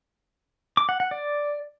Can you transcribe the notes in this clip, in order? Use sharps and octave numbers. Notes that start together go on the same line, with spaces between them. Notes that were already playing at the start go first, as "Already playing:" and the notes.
D6
F#5
F#5
D5